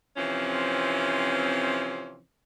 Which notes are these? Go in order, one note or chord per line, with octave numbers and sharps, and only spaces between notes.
C3 E3 F3 C4 C#4